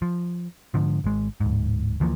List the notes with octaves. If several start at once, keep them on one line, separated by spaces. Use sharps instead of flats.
F3
G#2 D3 F3
G#1 G#3
D1 G#2
D2 E3 F3 A#3